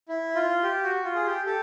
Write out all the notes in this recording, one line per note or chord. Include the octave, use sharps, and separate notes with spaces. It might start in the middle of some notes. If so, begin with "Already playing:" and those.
E4
F4
G4
F#4
F4
G#4
G4
G4 A4